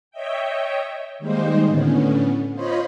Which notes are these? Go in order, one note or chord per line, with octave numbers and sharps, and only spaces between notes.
C#5 D#5 E5 G5
D#3 G3 G#3 A#3 D#4 C5
A2 D3 B3 C#4
F4 C5 C#5 D#5 B5